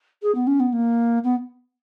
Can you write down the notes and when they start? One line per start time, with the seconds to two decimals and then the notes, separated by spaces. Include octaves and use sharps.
0.22 G#4
0.35 B3
0.47 C#4
0.60 B3
0.72 A#3
1.23 B3